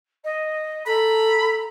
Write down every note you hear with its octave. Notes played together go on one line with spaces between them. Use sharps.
D#5
A4 A#5 B5